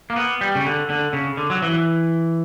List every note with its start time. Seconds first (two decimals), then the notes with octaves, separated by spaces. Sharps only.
0.10 A#3
0.16 B3
0.41 G3
0.55 C#3
0.65 D3
0.90 D3
1.13 C#3
1.37 D3
1.50 F#3
1.62 E3